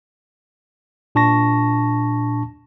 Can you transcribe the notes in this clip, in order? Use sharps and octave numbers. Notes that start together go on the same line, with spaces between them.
A#2 D4 A5 C#6 A#6